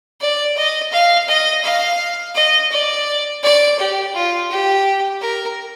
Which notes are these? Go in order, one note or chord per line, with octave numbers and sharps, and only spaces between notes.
D5
D#5
F5
D#5
F5
D#5
D5
D5
G4
F4
G4
A#4